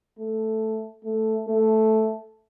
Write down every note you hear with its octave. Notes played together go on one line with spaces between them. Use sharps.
A3
A3
A3